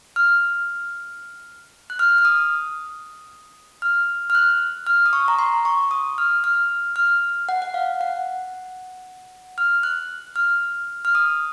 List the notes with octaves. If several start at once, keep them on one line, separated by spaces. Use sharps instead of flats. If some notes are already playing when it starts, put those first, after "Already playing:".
F6
F#6
F6
F6
D#6
F6
F6
F#6
F6
D#6
C#6
A#5
C6
C#6
D#6
F6
F6
F6
F#5
F#5
F5
F#5
F6
F#6
F6
F6
D#6